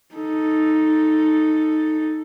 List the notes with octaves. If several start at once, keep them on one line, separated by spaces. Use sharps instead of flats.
D#4 A4